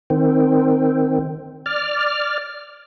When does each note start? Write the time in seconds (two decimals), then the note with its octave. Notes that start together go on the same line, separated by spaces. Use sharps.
0.10 D#3 C4
1.66 D5 F6